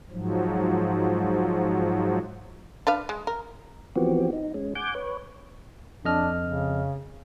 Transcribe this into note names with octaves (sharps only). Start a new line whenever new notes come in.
G#2 F3 F#3
D4 B4 F5
G#3
A#4
E3 F3 B3 C4 F#4 G4
D#4
G#3 C#4
F#5 G#5 D6 G6
B4 C#5
F2 D4 D#5 F6
C#3